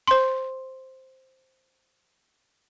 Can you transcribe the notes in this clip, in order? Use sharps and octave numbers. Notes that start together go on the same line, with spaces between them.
C5 C6